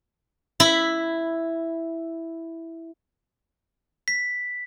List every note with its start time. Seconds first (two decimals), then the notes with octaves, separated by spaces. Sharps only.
0.60 E4 B5
4.08 B6